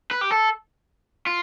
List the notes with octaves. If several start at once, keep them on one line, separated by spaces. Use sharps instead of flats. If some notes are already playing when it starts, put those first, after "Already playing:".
B4
G4
A4
F4